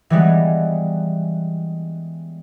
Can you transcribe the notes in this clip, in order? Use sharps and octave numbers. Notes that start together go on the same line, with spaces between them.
E3 G3 G#3 B3